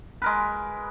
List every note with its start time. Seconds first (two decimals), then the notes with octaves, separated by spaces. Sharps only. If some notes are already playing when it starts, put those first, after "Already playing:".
0.22 G#3 A#4 B4